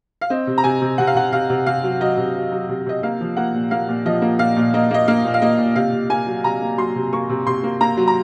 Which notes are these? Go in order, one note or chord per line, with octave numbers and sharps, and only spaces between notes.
F5
C4 D#5
C3
A#5
C3 G#5
C3
C3 F#5
F5
C3 F#5
C3 F5
C3
C3 F5
F#3
F#3 D#5
C3
F#3
F#3
C3
C3 D#5
A#3 F5
F3
A#3 F#5
A#2
A#3 F5
A#2
F3 D#5
A#3
A#2 F5
A#2
A#3 D#5
A#3 D#5
A#3 F5
A#2
F5
A#3 D#5
A#2
C3 F5
C3
A#3 G#5
F#3
C3 A#5
A#3
F#3 C6
C3
A#3 C#6
C3
C3 C6
A#3
A#3 A#5
F#3
A#5